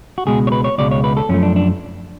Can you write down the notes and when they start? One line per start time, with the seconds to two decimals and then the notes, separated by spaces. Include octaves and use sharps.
0.18 F#4
0.26 C#2 B2 G#3 G#4
0.47 C#5
0.52 B4
0.64 C#5
0.78 C#2 B2 G#3 D5
0.91 C#5
1.04 B4
1.17 A4
1.29 F#2 F3 A3 C#4
1.43 D4
1.56 D4